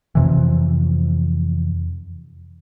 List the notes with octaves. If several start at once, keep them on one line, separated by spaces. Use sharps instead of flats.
F2 C3 E3